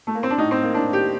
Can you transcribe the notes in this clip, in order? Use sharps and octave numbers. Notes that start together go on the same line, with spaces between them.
A3
A#3
C4
D4
A2 D#4
C4
A#3
A2 D4
G4